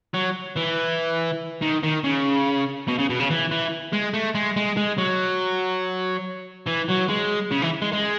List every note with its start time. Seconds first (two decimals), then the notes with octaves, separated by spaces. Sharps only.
0.14 F#3
0.57 E3
1.62 D#3
1.83 D#3
2.04 C#3
2.88 B2
2.98 C#3
3.10 B2
3.20 C#3
3.30 E3
3.51 E3
3.93 G#3
4.14 A3
4.35 G#3
4.56 G#3
4.77 G#3
4.98 F#3
6.66 E3
6.88 F#3
7.08 G#3
7.51 C#3
7.62 E3
7.82 G#3
7.93 G#3